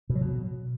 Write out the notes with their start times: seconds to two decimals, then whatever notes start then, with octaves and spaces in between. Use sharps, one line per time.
0.10 B2
0.15 F#3
0.21 B2